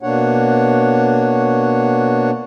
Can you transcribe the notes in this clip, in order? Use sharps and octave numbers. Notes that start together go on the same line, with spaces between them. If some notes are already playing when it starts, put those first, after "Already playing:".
B2 A#3 D4 C#5 F#5